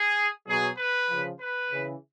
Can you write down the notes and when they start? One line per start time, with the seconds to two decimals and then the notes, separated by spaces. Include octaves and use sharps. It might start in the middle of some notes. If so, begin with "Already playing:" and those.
Already playing: G#4
0.48 B2 F#3 G#4
0.78 B4
1.10 C#3 F3
1.40 B4
1.71 C#3 E3